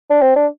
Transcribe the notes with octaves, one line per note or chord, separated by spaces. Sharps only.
D4
C4
D4